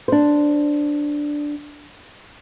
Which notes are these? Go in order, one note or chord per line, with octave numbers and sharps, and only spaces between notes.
D4 C5